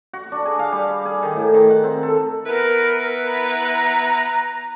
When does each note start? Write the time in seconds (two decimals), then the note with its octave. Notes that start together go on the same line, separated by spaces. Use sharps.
0.13 F#4
0.32 D4
0.45 G#4
0.59 F5
0.72 G3
1.05 G#4
1.22 D#3
1.36 A2
1.54 D#3
1.71 F#5
1.84 C4
2.03 A4
2.46 B3 E4 A#4 B4
3.26 A#5